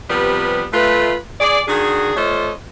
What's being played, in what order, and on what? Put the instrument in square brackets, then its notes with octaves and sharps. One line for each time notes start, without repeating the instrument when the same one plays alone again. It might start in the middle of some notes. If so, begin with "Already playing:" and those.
[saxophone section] C3 F3 G3 B3 B4
A3 F4 B4
G#4 D5
D#3 D4 F#4 G#4
A3 F4 A4 C5 C#5 D#5